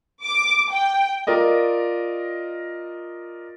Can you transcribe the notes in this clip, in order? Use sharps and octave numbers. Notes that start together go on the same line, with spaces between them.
D6
G5
F4 A#4 D5 D#5